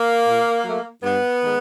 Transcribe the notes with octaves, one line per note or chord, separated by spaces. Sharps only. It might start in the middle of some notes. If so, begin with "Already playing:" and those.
Already playing: A#3
A#2
F#3 A3
G2 B3
D#3 G#3